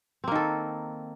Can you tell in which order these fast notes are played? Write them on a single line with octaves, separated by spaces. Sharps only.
C4 A#3 D#3 A4